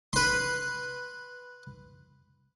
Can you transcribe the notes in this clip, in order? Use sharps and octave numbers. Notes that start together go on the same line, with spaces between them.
B4 C6